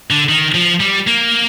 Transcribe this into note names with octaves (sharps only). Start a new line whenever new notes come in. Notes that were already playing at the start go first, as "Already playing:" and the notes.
D3
D#3
F3
G3
A#3